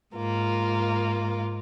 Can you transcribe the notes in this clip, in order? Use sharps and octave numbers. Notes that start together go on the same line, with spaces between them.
G#2 A#3 F4